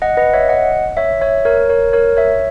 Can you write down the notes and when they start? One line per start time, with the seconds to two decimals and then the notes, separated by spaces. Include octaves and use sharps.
0.02 D#5 F#5
0.17 B4 D#5
0.33 C#5 E5
0.49 D#5 F#5
0.97 C#5 E5
1.21 C#5 E5
1.45 A#4 C#5
1.69 A#4 C#5
1.93 A#4 C#5
2.17 C#5 E5